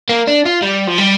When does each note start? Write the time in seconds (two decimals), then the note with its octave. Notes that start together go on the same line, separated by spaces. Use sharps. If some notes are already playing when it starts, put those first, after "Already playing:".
0.09 A#3
0.27 D4
0.45 F4
0.62 G3
0.87 F3
0.98 G3